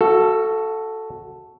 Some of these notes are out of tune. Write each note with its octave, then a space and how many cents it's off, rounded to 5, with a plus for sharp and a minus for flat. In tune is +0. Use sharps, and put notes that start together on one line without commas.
F#4 +0 A4 +0 F5 -40